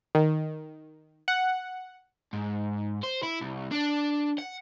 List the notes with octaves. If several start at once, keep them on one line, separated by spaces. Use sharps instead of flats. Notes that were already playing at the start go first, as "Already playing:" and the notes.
D#3
F#5
G#2
C5
E4
C2
D4
F#5